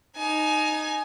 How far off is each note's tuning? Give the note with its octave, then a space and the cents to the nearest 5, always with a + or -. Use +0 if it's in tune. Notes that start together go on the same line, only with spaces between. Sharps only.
D#4 -10 G#5 +25